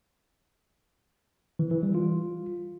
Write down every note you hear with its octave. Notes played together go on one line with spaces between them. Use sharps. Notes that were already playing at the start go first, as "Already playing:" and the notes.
E3
E3
G3
F4